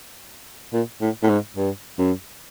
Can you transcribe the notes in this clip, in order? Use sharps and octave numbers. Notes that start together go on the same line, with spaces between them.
A#2
A2
A2
G#2
G2
F#2